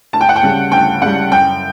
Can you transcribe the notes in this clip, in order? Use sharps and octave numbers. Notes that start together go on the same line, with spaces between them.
D2 A5
G5
F#5
G5
C#3 G3
D2 G5
C#3 G3 F#5
F#2 G5